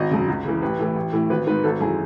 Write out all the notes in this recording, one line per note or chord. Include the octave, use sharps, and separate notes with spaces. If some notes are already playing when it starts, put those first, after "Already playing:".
Already playing: G#1 D#5
F#2 C#3
C#2
C#3 E3
A1 B4
A2 E3
A1
A2 E3
G#1 B4
G#2 D#3 B4
G#1 A4
F#2 E3 G#4